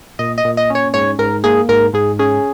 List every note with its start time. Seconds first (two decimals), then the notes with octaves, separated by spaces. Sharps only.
0.19 A#2 D#5
0.38 D#5
0.45 A#2
0.57 D#5
0.70 C#4
0.75 C#5
0.94 G#2 C#5
1.19 G#2 A#4
1.44 A#3 G#4
1.69 G#2 A#4
1.93 G#2 G#4
2.19 C#4 G#4